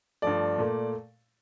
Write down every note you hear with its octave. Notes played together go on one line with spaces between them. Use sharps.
G2 F3 A3 D5
A#2 A3